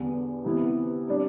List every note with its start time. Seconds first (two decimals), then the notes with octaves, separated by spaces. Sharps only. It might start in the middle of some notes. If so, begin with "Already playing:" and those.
Already playing: E2 D3 G3 B3
0.45 C3 E3 B3 E4
1.08 C3 G3 D4